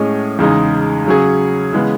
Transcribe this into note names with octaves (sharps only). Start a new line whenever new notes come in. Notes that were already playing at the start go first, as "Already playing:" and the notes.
Already playing: A2 G#3 C#4 G#4 D#5
E2 C#3 G#3 D#4
C#3 F#3 C#4 G#4
C#3 E3 G#3 B3